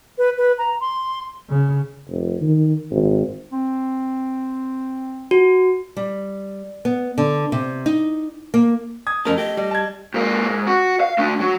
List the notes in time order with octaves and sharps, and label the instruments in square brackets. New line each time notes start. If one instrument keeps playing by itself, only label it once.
[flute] B4
B4
A#5
C6
[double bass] C#3
[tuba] F1
D#3
G#1
[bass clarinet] C4
[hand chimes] F#4
[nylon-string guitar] G3
B3
D3
C3
D#4
A#3
[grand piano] D#6 G#6
[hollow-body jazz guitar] F2 A#4 A5 [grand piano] A3 [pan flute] C#4
[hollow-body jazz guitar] G4 [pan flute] D#5
[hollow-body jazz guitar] G3
[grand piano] A5 G#6
[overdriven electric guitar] G#2 A#3
G#2
F#4
F5
A3 D4
F#3